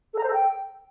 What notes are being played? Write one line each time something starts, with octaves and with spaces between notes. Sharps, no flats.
A4
A#5
C5
A4
G5